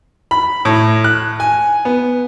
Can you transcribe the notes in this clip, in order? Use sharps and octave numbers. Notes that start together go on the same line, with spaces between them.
B5
A2
F#6
G#5
B3